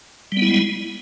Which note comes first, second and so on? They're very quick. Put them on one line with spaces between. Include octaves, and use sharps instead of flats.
G3 B3 E4 G#3